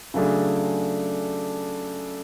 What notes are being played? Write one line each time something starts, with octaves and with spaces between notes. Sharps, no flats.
C#3 F#3 A3 D4 G#4